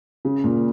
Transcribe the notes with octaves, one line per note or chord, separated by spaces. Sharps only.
C#3
A#2